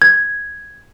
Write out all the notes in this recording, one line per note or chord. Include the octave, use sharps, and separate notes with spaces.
G#6